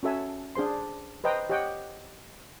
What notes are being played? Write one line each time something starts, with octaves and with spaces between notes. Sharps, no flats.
C#4 F#4 A4 E5 G#5
D4 G#4 C5 C6
B4 C5 D#5 G5 A#5
G4 C#5 D#5 F#5 G5